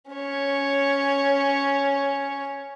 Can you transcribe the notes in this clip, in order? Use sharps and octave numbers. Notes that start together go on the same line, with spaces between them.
C#4 C#5